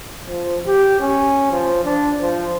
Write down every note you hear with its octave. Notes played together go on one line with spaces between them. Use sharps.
F3
G4
C#4
F3
D4
F3